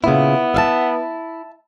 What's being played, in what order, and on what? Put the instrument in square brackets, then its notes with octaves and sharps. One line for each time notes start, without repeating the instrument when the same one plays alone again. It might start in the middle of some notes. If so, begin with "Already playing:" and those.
[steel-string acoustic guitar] A#2 C#3 [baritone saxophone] B3 [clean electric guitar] E4
[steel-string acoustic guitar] E5 F5 A5